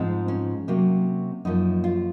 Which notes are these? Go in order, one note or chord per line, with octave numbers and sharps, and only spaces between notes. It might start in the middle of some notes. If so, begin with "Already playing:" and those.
Already playing: G#2 F3 G#3 C4
C#4
C3 F#3 A#3
F#2 F3 A#3 D#4
F4